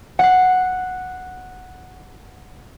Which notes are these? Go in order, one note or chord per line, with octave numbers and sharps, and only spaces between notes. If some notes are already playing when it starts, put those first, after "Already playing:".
F#5 C7